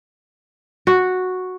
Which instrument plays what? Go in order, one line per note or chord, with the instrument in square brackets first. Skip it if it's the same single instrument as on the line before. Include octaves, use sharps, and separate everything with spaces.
[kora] F#4